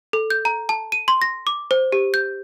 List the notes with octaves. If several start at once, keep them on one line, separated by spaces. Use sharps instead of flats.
A4
G6
A#5
A5
D#7
C6
A#6
D6
C5
G4
G6